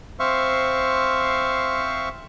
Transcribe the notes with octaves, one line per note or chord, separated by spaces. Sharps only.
C4 C5 E5 F5 C#6